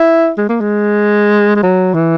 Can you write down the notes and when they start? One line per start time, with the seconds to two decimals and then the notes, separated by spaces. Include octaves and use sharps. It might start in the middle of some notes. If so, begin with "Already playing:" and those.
Already playing: E4
0.38 G#3
0.49 A#3
0.61 G#3
1.56 G#3
1.63 F#3
1.94 E3